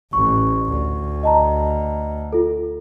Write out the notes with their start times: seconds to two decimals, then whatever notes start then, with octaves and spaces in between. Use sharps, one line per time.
0.13 A1 C#6
0.70 D2
1.23 D#5 A5 A#5
2.33 F4 A4